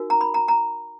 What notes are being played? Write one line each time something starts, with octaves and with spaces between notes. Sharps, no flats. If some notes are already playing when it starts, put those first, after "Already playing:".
Already playing: D#4 F#4 A#4
A#5
B5
A#5
A#5